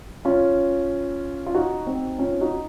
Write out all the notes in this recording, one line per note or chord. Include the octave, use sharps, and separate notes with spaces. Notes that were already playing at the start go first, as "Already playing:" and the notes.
C#4 F4
F4
D#4 F#4
C4 D#4
C#4 F4
D#4 F#4